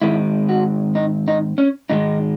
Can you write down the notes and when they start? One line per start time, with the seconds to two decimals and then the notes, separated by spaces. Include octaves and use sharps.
0.02 G#2 D#3 G#3 C4 E4
0.49 F#4
0.95 D#4
1.28 D#4
1.58 C#4
1.90 G#2 D#3 G#3 D#4